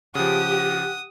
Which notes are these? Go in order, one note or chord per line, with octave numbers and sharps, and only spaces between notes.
C#3 F3 G4 F#5 D#6